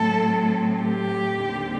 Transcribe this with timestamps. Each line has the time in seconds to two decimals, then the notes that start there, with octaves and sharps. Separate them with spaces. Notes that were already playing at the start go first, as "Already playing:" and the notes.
Already playing: A2 F#3 A3 C4 A4
0.84 G4
1.44 D#2 D3 G3 C4